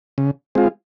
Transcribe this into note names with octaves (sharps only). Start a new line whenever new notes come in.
C#3
G#3 C4 F4